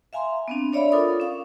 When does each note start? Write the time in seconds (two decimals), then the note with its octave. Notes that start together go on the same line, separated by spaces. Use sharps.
0.13 E5 F5 G#5 A#5 C6
0.48 B3 C4 D4
0.73 D4 C#5 D5 E5 F5 B5
0.92 F4 A4 A#4 D6 D#6
1.20 C#4 F5